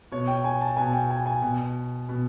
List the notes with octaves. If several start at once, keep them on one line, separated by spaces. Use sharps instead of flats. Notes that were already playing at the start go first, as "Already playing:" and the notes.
B2 C#5
G5
G#5
A5
B2 G#5
G5
G#5
G#5
B2
B2